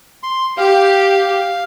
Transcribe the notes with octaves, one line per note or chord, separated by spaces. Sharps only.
C6
G4 F5